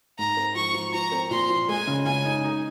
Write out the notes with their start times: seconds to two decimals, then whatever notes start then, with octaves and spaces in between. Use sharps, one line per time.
0.18 G#2 A#5
0.37 C4
0.55 F3 C#6
0.74 F3
0.94 F3 A#5
1.12 C4
1.31 A#2 C6
1.50 F3
1.69 G#3 G#5
1.87 C#3
2.06 C#3 G#5
2.25 D#4
2.44 D#4